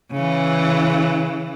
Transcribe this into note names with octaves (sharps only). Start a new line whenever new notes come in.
C#3 E3